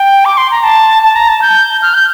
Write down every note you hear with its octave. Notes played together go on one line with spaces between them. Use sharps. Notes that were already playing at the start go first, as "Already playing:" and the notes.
Already playing: G5
D6
C6
A#5
A5
A5
A#5
A5
G6
F6
G6